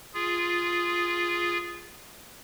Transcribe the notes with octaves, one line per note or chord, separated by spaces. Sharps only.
F4 G#4